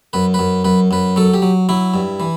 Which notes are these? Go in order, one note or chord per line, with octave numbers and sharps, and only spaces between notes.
F#2 B4
B4
F#2
F#2 B4
F#2 B4
F#3 A4
G4
F#3
F#3 E4
G2
E3